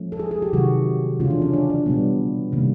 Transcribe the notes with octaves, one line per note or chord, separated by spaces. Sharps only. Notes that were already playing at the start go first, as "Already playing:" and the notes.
Already playing: F3 A3 C#4
A4
G#4
G#4
G4
C3 D#3 F#3 A3 F#4
C#3 E3 A3 C#4 F4
D4
C#4
D4
D4
B2 G3 B3
C3 D#3 G3 A#3